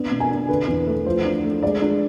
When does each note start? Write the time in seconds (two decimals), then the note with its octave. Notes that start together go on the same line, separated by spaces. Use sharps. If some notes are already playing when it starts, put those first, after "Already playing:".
Already playing: B3 D4
0.11 B2
0.20 G#5
0.31 D4
0.49 D3 B4
0.68 E2
0.87 A3
1.06 F3 C5
1.25 D4
1.44 A3
1.63 G#3 D5
1.82 D4